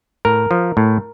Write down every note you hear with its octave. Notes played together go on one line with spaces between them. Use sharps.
A2 A#4
F3
A2